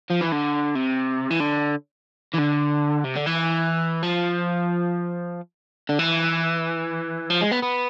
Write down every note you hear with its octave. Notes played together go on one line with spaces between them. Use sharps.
F3
E3
D3
C3
E3
D3
E3
D3
C3
D3
E3
F3
D3
E3
F3
G#3
B3
B3